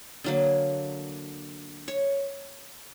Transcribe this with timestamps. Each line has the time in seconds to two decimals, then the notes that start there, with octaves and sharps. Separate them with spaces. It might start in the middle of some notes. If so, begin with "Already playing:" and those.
0.24 D3 F#3 A#3
1.88 C#5